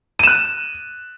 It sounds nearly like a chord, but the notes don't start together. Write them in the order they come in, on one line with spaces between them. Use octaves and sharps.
D#7 E7 F#6